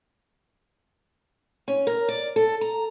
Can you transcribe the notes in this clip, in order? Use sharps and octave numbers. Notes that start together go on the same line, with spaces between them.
C#4
A#4
D5
A4
A#5